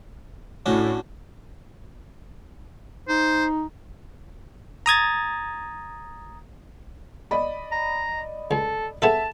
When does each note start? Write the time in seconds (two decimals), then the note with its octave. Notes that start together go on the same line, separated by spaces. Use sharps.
0.66 A2 C#4 D4 F#4
3.08 D#4 C5
4.86 A#5 D#6 G#6 A6
7.31 D5 D#5 B5
7.72 A#5
8.51 C#2 A4
9.02 B3 G#4 A4 E5 A5 E7